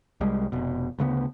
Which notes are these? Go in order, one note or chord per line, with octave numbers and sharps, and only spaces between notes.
C2 G3 G#3
F1 B2
D2 C#3 G#3 B3